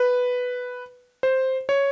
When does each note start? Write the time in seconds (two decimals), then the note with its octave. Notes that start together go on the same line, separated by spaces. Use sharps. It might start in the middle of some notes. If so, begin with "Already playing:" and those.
Already playing: B4
1.23 C5
1.69 C#5